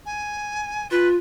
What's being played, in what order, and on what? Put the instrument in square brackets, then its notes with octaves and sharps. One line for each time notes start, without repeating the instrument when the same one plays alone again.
[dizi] G#5
[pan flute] F4 [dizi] B4